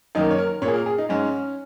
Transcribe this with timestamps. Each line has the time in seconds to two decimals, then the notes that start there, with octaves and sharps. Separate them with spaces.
0.15 F#2 D#3 A#3 D#4
0.31 C#5
0.38 A#4
0.62 A#2 C#5
0.66 A#3 G#4
0.74 A#4
0.86 G#4
0.98 D#4
1.09 G#2 G#3 C#4